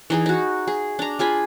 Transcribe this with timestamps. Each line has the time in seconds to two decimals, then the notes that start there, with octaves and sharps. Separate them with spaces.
0.10 E3 D#4 G#4
0.26 D#4 F#4
0.68 G#4
0.99 D4 A#5
1.19 F4 G#4 G#5 B5